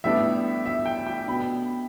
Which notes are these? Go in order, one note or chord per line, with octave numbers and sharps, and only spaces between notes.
A2 G3 B3 D4 E5
E5
G5
G5
B2 B3 D4 B5